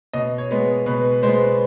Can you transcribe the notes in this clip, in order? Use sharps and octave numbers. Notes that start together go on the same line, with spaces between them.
B2 D#5
C#5
G#3 B3
B2 B4
G#3 B3 C5